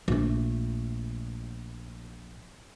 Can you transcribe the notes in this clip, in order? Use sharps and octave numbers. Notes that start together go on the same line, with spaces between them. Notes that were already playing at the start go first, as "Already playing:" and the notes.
A#1 A3